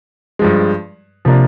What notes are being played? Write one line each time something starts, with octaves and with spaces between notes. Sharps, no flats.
G2 F3 G#3
C3 F3 A#3 D4